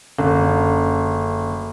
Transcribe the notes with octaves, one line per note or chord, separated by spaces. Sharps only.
F#1 D3 C#4 A4